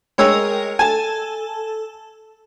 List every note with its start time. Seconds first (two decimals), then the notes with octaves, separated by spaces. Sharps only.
0.18 G#3 A#4 C#5 D#5 G5 E6
0.79 A4 G#5 A5